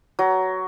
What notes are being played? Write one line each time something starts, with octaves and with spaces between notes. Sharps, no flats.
F#3